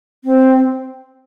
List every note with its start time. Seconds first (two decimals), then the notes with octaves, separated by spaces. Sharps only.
0.24 C4